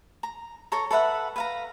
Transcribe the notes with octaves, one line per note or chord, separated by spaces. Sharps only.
A#5
A4 C#5 A#5 C#6
A4 B4 E5 F#5
B4 F5 A#5